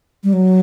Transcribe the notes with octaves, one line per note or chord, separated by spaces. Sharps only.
G3
F#3